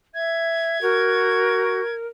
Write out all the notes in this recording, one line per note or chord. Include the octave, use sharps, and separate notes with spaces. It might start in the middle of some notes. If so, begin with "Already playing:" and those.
E5 G#6
F#4 A#4